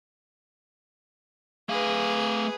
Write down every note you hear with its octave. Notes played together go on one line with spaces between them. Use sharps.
A3 G#4 B4 F5